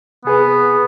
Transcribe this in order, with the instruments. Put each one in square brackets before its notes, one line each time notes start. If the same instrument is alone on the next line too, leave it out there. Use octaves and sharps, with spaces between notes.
[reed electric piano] C3 G#4 B4 [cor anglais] B3